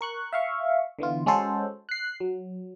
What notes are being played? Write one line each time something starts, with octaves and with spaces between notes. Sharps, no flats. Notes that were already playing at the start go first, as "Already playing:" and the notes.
A#4 C#6 F#6
E5 F5 C#6
D3 E3 B3 F4
G#3 C#4 F#4 A4 C5
F#6 C7
F#3